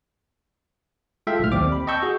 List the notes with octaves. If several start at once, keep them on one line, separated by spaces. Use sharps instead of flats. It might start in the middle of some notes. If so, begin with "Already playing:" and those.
G#3 F4 A4 E5 F5 G5
B1 A2 F6
D#2 C4 D5 D6
B5
D#5 G5 A5 C#6 E6 G6
F#4 G#4